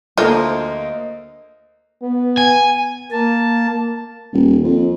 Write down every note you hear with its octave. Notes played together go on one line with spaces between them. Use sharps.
D2 F3 A#3 A4 D#5 E5
B3
G#5
A#3 A5
D#1
F2